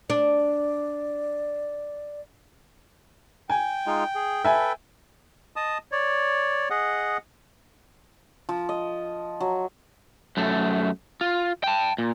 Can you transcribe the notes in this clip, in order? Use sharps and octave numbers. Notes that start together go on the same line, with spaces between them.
D4 D5
G5 G#5
G#3 D#4 F4
G#4
A4 B4 E5 G#5
D#5 A5 D#6
C#5 D5
G#4 D#5 F#5
F3
D#5
F#3
F#2 A3
F4
G5 A5
A#2